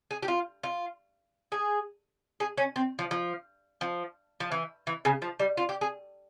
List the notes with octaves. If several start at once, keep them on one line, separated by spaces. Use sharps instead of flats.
G#4
G4
F4
F4
G#4
G#4
C#4
C4
F3
F3
F3
F3
E3
E3
C#3
F3
G3
F4
G4
G#4